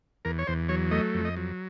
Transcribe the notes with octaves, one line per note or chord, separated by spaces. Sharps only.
E2 A#4
C#5
E2 C5
F#3 C#5
A3 D#5
F2
D#5
F#3